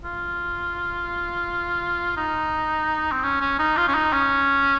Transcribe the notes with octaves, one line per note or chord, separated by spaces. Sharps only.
F4
D#4
C4
C#4
C#4
D#4
F4
C#4
D#4
C#4